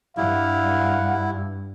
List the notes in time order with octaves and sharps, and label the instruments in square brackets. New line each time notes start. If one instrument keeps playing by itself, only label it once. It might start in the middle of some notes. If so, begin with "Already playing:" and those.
[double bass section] G2 [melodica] E4 [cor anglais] F5 [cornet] F#5